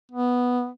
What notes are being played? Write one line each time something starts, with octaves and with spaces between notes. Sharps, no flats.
B3